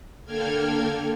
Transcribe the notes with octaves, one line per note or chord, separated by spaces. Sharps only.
D3 A#3 A4 G5 F6 G#6